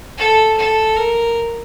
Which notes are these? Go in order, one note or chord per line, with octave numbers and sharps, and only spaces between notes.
A4
A4
A#4